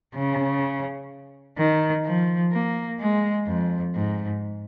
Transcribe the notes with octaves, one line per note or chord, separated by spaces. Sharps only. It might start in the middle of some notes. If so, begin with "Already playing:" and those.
C#3
D#3
F3
A#3
G#3
F2
G#2